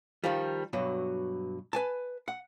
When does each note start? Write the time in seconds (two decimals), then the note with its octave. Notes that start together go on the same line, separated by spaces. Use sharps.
0.24 D#3 F3 G3
0.73 G2 B2 F#3
1.73 B4 G#5 A5
2.28 F#5